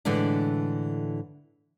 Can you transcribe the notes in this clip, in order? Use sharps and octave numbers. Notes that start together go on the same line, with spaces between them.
A2 D3 E3 G#3 D4